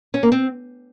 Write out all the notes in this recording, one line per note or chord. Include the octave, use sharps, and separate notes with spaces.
C#4
A#3
C4